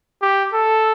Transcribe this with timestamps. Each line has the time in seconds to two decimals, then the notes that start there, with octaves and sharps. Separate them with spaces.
0.22 G4
0.53 A4